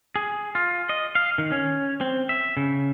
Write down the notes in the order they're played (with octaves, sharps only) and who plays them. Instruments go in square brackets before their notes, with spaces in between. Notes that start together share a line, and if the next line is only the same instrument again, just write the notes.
[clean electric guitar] G#4
F4
D#5
F5
D#3
C#4
C4
E5
C#3